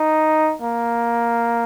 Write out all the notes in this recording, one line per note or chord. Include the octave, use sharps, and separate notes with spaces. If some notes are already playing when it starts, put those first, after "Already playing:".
Already playing: D#4
A#3